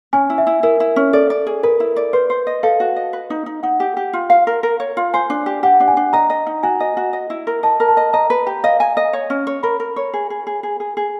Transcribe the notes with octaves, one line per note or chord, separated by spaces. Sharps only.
C#4 G#5
E4
E5
E4
E4 A#4
E4
C#4
A4 D5
D5
G#4
A#4 B4
E4
D5
B4 C5
C5
D#5
A4 F5
F#4
D#5
B4
D#4
D#4
D#4 F#5
G4
G4
F4
F5
A#4
A#4
C#5
F4
C5 G#5
D4
G4
G4 F#5
D4
G#5
D4
D#5 A#5
D#5
D#4
F#4 G#5
D#5
F#4
D#5
E4
A#4
D#5 A5
A#4
A5
D#5
D#5 A#5
B4
G4
D#5 F5
G#5
D#5
C#5
C#4
C#5
A#4 B5
A#4
C#5
G#4
G#4
G#4
G#4
G#4
G#4